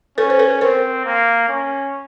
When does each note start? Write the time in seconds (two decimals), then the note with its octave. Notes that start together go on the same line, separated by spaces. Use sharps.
0.18 C#4 A4 B4
0.30 C5
0.39 A4 B4
0.61 C4 A#4 C5
1.05 A#3
1.48 C#4